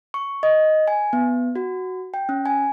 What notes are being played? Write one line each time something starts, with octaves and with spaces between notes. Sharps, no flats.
C#6
D#5
G#5
B3
F#4
G5
C#4
G#5